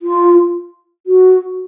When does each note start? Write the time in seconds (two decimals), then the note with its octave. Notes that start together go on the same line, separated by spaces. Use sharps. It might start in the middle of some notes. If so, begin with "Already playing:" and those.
0.02 F4
1.07 F#4